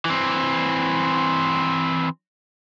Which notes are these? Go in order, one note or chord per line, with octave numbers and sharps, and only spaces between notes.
E3 C4